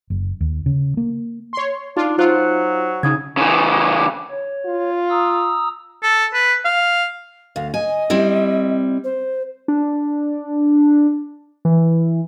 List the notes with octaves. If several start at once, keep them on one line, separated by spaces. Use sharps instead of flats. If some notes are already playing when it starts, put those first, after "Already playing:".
F#1
D#2
C#3
A#3
C#5 C6
D4 D#4 F4
F#3 D#4 F4 C5 F#6
C#3 D#4 D#6 G#6
C#3 E3
C#5
F4
A#5 D#6 E6
A4
B4
F5
D2 F5
D#5 G#5
G3 C4 E4
C5
D4
E3